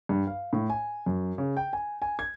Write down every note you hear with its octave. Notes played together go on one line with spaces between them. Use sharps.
G2
F5
A2
G#5
F#2
C#3
G5
G#5
G#5
G#6